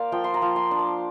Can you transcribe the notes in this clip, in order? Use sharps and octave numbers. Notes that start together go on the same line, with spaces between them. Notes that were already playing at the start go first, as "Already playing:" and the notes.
Already playing: A#3 C5 D5 F5
F3 G5
C6
A#5
F3
C6
D4
D6